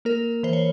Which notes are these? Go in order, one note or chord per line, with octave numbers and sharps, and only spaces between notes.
A#3 A#4
E3 C5
C#5